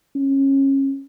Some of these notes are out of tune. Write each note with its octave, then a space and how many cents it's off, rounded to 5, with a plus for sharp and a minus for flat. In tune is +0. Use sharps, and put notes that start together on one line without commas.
C#4 -25